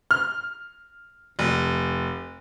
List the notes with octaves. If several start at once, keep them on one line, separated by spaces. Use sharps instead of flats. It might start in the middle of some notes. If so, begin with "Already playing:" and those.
F6
F1